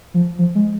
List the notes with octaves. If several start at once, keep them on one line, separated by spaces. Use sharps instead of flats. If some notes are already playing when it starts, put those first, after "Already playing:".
F3
F3
G#3